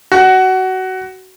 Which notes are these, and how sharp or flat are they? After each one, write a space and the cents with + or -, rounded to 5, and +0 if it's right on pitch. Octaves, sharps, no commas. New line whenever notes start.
F#4 +20